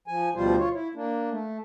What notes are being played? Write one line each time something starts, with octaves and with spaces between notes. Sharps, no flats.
F3 G#5
D2 B2 F3 G3 F4 C5
F4 C#5
E4
A#3 D4
A3